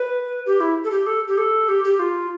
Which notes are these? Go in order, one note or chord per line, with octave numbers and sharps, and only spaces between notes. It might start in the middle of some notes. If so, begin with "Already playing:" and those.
Already playing: B4
G4
E4
A4
G4
A4
G4
A4
G4
G4
F4